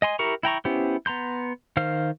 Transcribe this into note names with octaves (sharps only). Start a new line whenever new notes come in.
D#5 G#5 C6
E4 G4 A#4 A#5 C#6
E4 G5 A#5 C#6
B3 C#4 E4 G4 C5
B3 A#5 C6 G6
D#3 C5 F5 F6